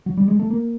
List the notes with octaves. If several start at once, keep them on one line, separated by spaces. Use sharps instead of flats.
F#3
G3
G#3
A3
A#3